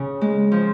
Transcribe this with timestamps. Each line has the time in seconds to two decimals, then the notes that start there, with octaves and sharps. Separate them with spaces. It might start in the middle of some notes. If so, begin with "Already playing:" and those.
Already playing: C#3
0.21 G#3
0.52 F3